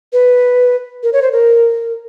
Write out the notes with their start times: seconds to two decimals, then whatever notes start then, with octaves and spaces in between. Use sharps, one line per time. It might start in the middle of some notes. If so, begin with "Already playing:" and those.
0.13 B4
1.03 A#4
1.13 C#5
1.22 C5
1.32 A#4